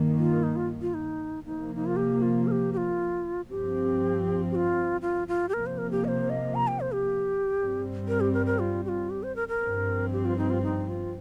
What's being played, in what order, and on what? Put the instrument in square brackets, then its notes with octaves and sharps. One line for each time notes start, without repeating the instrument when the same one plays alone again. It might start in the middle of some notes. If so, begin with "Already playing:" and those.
Already playing: [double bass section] G2 D#3 A#3
[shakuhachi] F4
D#4
F4
F4
D#4
[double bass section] C3 F3 A#3 [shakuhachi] D#4
[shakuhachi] D#4
F4
G4
F4
A#4
G4
G4
F4
[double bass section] G2 F3 C4 [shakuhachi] G4
[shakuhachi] G4
F4
F4
F4
G4
[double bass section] C3 F3 A#3 [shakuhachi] A#4
[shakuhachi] C5
A#4
G4
D#5
C5
D#5
A#5
G5
C5
G4
[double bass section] G2 G3 C4
[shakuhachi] A#4
G4
A#4
A#4
F4
G4
F4
G4
C5
A#4
A#4
[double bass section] G2 F3 C4
[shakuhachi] G4
F4
D#4
F4
D#4
F4